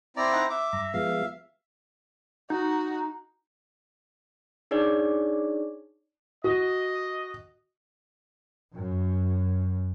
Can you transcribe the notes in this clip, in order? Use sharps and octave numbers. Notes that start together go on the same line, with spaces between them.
C4 E4 D5 A#5
D#4 F#5
E5 D6
G2 A#5
F3 G#3 B3 F5
D#4 F#4
D4 D#4 G#4 C#5 D5
F#4 D#5
F#2